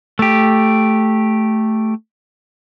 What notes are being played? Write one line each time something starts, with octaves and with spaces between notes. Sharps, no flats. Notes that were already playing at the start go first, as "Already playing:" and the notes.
A3 G4